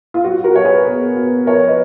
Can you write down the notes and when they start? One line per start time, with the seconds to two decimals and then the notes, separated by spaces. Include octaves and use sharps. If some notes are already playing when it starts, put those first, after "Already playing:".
0.14 F4
0.24 F#3 F#4
0.44 F#4 A#4
0.55 F#3 C#5
0.65 G#4 B4
0.86 B2
1.16 B2
1.46 F3 A#4 C#5
1.67 B4 D#5